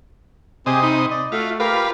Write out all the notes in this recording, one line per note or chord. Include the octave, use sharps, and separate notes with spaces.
C3 C4 G4 G#4 D#5
D#4 B5
D5 D#5
A3 F4 F#4 E5 F5
F4 G4 A#4 B4 F5